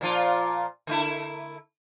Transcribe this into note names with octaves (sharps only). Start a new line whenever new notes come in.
A#2 F3 F4
D3 A3 E4